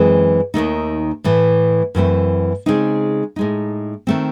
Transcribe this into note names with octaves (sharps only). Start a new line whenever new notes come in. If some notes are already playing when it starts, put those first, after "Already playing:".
Already playing: F#2 E3 G#3 C4
D#2 D#3 A3 D#4
A2 E3 A3
F#2 E3 A3 C4 E4
C#3 G#3 C4 D#4
A2 G#3 D#4
D#3 A3 C4